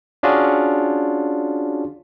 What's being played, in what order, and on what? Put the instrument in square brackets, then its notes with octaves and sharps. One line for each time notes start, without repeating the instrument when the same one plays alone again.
[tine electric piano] C#4 D4 F4 F#4 G#4